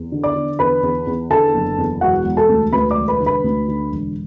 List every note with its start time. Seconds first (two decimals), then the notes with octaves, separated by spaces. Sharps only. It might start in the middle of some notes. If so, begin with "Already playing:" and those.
Already playing: E2
0.12 D3
0.23 D5 D6
0.35 D3
0.59 E2 B4 B5
0.83 E2
1.07 E2
1.30 D3 A4 A5
1.54 F#1
1.78 E2
2.01 E1 F#4 F#5
2.25 E1
2.37 A4 A5
2.49 D2
2.72 D2 B4 B5
2.91 D5 D6
2.97 E1
3.08 B4 B5
3.20 D3
3.26 B4 B5
3.44 D2
3.68 D3
3.91 E1